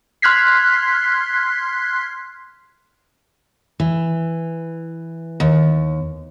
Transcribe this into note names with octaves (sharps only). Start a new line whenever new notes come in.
C6 F6 F#6 G#6 B6 C7
E3
D#2